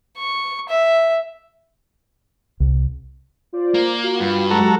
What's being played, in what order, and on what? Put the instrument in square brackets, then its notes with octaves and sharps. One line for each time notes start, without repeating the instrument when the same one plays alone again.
[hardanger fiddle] C#6
E5
[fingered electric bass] C2
[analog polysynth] F4 C5 D5
[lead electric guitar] A#3
[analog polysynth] F4 F#4 F5
[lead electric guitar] G2
[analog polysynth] F#3 G#3 G4 [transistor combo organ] F#4 A4 A#5